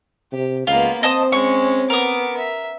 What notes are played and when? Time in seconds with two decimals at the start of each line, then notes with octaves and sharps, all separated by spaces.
0.33 C3 G4
0.67 C#2 A#3 B3 F4
1.03 C4 C5 D#5 A5 D#6
1.32 G#3 C#4 C#6
1.90 B3 A#4 D6 D#6
2.38 E5